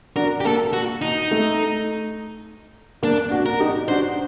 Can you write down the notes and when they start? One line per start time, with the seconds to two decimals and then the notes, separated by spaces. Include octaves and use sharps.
0.16 D4 F#4 A#4
0.40 G4
0.45 A#3 A4
0.73 F#4
1.02 D#4
1.31 A3
3.03 A#3 D4
3.31 D4 F#4
3.46 A#4
3.60 D#4 G4
3.88 D4 F#4 C5